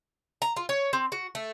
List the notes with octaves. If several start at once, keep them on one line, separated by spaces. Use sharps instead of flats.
A#5
F4
C#5
C4
F#4
A3